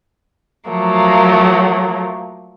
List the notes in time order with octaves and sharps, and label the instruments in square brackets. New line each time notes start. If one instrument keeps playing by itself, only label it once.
[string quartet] F3 F#3 A3 A#3